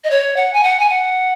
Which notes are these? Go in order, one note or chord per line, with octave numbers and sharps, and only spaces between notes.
D#5
C#5
F#5
G#5
F#5
G#5
F#5